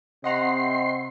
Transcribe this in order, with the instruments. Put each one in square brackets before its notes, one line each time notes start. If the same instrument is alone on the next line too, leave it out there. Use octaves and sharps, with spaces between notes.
[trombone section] C3 C4 [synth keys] D#5 F#5 A#5 [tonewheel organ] C6